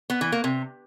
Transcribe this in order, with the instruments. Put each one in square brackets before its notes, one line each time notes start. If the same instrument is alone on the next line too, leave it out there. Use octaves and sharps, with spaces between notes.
[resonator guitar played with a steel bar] B3
E3
A#3
C3